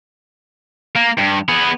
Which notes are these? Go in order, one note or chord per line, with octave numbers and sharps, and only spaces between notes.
A#3
G2
B3 G#4